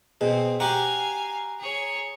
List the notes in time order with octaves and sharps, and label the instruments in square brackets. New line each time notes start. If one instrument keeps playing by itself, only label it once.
[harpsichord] B2 [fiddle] C4 [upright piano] G#4
[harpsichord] F#4 G4 [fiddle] F5 G#5 [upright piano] A#5
[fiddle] G#4 C#5